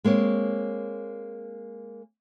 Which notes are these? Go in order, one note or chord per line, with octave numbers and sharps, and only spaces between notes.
G#3 A#3 C4 C#5